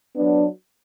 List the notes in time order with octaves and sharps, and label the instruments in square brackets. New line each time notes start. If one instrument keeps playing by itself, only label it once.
[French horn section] F#3 B3 D4